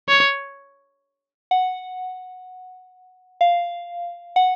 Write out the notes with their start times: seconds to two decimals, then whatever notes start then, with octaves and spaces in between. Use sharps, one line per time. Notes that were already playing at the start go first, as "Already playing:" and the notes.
0.09 C#5
1.51 F#5
3.41 F5
4.36 F#5